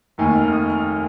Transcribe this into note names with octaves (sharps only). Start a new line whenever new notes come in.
F1 D#2 D#3 G#5
F6
D#6
F6